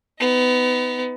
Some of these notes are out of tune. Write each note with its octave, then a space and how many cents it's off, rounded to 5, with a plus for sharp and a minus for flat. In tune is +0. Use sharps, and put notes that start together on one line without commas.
B3 +25 D#4 +35